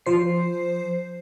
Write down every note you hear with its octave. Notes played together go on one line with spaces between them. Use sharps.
F3 C5 C7